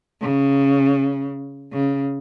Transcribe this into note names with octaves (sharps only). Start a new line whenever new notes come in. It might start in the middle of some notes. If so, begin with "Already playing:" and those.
C#3
C#3